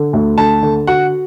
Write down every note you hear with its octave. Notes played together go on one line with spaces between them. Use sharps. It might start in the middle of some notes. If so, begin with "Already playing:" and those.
Already playing: D3
D2
D3 A5
D3
F#4 F#5